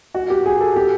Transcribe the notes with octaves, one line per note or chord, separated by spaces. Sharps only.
F#4
G4
G#4
A4
G4